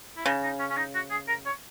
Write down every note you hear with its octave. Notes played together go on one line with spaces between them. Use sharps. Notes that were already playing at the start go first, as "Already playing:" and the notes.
E4
C#3 D#4
D#4
C#4
C#4
D#4
F#4
G#4
A#4
C#5